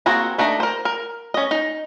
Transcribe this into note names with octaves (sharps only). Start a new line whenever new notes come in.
A#3 C4 F#4 G#4 A#5
A3 D4 D#4 A#5
A#4 C5
A#4
C#4 D#5
D#4